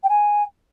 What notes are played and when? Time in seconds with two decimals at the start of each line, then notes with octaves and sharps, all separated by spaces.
0.03 G5
0.09 G#5